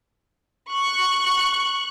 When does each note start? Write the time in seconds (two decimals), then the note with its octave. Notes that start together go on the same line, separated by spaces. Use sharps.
0.72 C#6 F#6